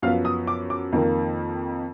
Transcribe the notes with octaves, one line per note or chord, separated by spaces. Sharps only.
F#2 F3 B3 F5
D#6
D6
D6
F2 D#3 A#3